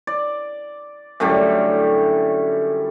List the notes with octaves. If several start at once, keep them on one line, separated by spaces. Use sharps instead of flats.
D5
F#2 A2 D3 G3